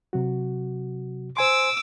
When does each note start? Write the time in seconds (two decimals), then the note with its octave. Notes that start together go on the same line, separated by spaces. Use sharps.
0.13 C3 F#3 F#4
1.37 C5 G#5 C6 D6 E6